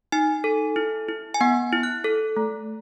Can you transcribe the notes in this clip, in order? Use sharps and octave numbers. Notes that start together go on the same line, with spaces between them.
D#4 G#5
A4
E4
E4
G#5
B3 F#5
E4
F#6
A4
A3